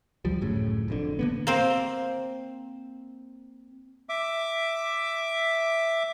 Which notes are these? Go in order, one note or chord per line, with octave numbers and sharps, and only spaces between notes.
D2 F3 G3
D1 F#2 A2 C#3
F1 F2 D3
D3 A#3 B3
A#3 C4 C5
E5 D6